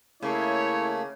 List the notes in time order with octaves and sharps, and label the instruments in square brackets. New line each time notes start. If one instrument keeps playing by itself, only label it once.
[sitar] C#3 [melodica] A3 A#3 [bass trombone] E4 [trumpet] C#5